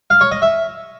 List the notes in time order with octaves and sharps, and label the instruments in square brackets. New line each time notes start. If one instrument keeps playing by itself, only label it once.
[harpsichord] F5
C#5
D#5
E5